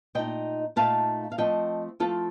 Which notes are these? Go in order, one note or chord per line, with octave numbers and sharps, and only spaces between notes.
A#2 A3 D#4 D#5 G5
A#2 A3 D#4 F5 A5
F5
F3 A3 C4 D#5 G5
F3 A3 C4 F4 A4